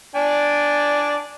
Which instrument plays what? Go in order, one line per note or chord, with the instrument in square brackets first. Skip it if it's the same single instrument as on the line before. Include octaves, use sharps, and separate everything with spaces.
[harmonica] D4 D5 G#5